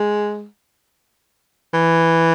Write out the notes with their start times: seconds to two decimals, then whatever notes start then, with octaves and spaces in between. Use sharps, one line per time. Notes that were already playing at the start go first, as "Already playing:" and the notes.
Already playing: G#3
1.74 E3